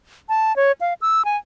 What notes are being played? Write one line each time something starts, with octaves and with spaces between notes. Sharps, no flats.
A5
C#5
F5
E6
G#5